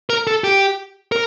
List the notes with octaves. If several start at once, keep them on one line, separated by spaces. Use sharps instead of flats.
A#4
A4
G4
A#4